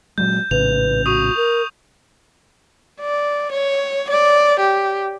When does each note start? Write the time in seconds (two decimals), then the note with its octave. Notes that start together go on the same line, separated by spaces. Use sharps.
0.18 A#2 F#3 G#3 G6
0.51 A#1 A2 C#3 B4 F7
1.06 F#4 C#6 D#6
1.36 A#4
3.00 D5
3.52 C#5
4.09 D5
4.59 G4